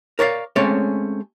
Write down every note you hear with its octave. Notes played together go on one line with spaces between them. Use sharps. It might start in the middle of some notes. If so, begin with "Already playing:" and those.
A#4 C#5 D5 E5 F5
G#3 A3 C4 C#4 C#5 D5